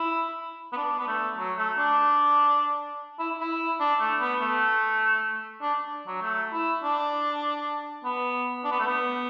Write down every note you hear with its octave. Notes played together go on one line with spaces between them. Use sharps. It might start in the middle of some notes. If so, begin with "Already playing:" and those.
Already playing: E4
B3
D4
B3
A3
F#3
A3
D4
E4
E4
D4
A3
B3
A3
D4
F#3
A3
E4
D4
B3
D4
B3
A3
B3